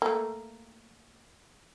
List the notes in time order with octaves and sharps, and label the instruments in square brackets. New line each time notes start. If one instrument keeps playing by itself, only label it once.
[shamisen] A3 A#3